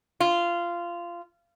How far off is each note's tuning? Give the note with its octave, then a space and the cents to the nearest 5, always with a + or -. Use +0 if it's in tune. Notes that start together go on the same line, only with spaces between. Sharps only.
F4 -15